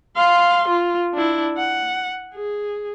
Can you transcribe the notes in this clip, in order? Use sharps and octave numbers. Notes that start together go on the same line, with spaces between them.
F5 C6
F4
D4 E4
F#5
G#4